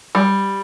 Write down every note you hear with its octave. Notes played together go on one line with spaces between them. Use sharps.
G3